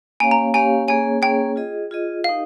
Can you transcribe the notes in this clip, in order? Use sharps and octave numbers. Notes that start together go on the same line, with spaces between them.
A#3 C#4 G4 C#5 F5 G#5
A#5
A#3 C#4 G4 C#5 F5 G#5
A#3 C#4 G#4 C#5 G#5
A#3 C#4 G#4 C#5 G5
F4 G#4 D#5
F4 G#4 D#5
D#4 G4 A#4 D#5 F5